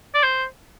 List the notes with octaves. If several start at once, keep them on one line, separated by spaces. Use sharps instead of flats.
D5
C5